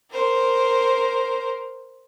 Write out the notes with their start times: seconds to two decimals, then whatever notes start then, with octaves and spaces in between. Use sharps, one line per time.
0.11 A#4 C5